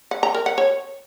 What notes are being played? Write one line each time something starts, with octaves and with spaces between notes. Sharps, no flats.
F#5
A#5
A#4
F#5
C#5